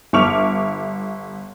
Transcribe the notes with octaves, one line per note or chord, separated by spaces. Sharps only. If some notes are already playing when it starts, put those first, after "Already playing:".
G1 E5 C#6 D6 F6 F7